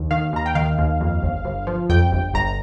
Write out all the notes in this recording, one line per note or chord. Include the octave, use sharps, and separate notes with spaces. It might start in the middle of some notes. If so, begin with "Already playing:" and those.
Already playing: D#2
D#3 F5
D#2 A#5
G5
D#3 F5
D#2
F2
G1
G1
F3
F2 G5
G1
G1 A#5